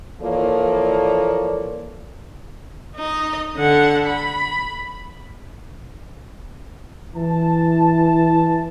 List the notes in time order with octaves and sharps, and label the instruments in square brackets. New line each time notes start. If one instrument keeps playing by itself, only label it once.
[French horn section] E3 F3 A#3 A4 C#5 D5
[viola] D#4 D#5
D3 F#5
B5
[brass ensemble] E3 A5